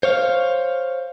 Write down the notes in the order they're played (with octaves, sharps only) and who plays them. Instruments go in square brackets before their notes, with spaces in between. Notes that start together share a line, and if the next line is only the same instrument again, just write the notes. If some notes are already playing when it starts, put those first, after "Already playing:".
[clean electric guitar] C5 C#5 F5